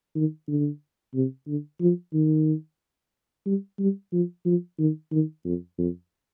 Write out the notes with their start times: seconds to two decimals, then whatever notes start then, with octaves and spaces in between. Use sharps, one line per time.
0.16 D#3
0.48 D3
1.15 C3
1.47 D3
1.81 F3
2.13 D#3
3.46 G3
3.79 G3
4.13 F3
4.46 F3
4.79 D#3
5.12 D#3
5.45 F2
5.78 F2